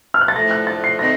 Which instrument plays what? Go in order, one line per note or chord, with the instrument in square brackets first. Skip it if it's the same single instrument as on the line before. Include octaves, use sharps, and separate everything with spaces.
[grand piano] F6
F#6
A6
[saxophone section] A2 F3 A3 [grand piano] A#6
[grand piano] F#6
A6
C7
[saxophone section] D#3 A3 C4 [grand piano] A#6